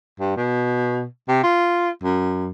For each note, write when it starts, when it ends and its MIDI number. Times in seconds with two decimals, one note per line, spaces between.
0.20 0.36 43
0.36 1.05 47
1.28 1.40 48
1.44 1.90 65
2.03 2.49 42